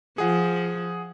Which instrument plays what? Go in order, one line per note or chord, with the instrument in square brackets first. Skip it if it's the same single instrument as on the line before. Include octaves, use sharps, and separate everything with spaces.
[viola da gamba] F3 [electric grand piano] G#4 F#5